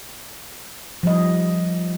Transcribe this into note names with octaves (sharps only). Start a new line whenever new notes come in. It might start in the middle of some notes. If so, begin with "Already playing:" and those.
F3 G3 D#5